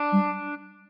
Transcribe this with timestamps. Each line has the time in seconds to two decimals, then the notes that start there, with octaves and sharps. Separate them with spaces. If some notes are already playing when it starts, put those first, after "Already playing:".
Already playing: D4
0.12 G3